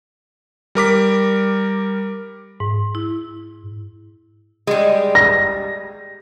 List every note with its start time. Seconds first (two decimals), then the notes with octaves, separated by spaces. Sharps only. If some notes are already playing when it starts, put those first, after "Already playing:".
0.75 G3 A#4 D6 B6
2.60 G#2
2.95 E4
4.67 G3 G#3
5.15 A#6